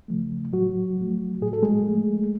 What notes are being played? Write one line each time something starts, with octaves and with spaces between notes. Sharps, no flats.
C#3 F3 A3
A2 F#3 F#4
F3 A3
A2 G#4
A4
G#3 G#4
F3 A3